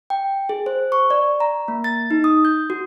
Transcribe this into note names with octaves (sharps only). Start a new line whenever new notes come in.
G5
G#4
C5
C#6
D5
A#5
A#3
A6
D#4
D#6
G6
F#4